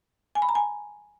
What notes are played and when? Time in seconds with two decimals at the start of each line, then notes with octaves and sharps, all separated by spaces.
0.35 G#5
0.42 B5
0.49 A#5
0.55 G#5